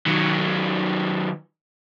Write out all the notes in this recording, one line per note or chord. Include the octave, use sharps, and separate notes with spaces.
D#3 F#3